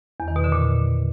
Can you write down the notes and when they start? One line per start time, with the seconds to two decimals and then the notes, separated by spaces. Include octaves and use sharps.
0.20 E2
0.28 D#3
0.36 B2
0.44 D3
0.52 A#2